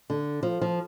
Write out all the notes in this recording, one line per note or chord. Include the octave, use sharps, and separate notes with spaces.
D3
F3
F3